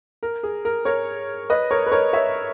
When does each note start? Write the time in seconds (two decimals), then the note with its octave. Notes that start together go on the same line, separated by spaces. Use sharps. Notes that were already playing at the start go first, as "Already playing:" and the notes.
0.23 A#4
0.43 G#4
0.65 A#4
0.85 A#4 C#5
1.50 B4 D#5
1.71 A#4 C#5
1.86 B4
1.92 A#4 C#5
2.13 C#5 E5